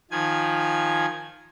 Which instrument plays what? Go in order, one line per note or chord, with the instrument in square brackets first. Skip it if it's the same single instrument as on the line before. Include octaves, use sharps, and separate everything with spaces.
[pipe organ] D#3 F3 G#5 G#6